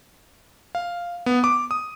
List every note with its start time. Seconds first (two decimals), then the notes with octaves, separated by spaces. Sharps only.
0.75 F5
1.26 B3
1.44 D6
1.71 D#6